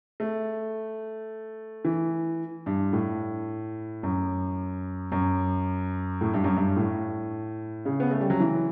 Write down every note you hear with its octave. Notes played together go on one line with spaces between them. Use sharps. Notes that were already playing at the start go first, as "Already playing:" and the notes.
A3
E3
G2
A2
F#2
F#2
A2
G2
F#2
G2
A2
C#3
B3
A3
G3
F#3
E3